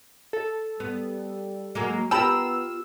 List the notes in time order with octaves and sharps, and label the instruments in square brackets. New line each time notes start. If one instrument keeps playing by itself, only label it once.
[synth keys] A4
[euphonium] G3 [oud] B3
[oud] F#3 G#3 A#3
[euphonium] B3 [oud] F4 G4 A#4 [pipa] G5 A5 B5 [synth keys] E6